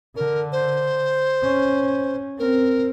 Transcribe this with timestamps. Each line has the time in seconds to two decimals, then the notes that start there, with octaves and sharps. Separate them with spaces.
0.16 D3 A#4
0.52 C5
1.43 C#4
2.39 C4 A#4